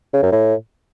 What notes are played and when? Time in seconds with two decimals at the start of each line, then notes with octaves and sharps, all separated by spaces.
0.13 C#3
0.23 F#2
0.32 A2